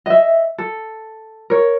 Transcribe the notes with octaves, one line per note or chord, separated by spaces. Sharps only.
D#5 E5
A4
A#4 C#5